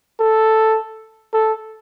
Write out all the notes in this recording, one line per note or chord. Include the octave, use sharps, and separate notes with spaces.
A4
A4